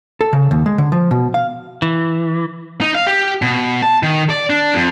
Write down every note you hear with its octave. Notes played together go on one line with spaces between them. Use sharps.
A4
C#3
D#2
G#3
D3
F3
B2
F5
E3
D#4
F5
G4
B2
A5
D#3
D5
D4
F2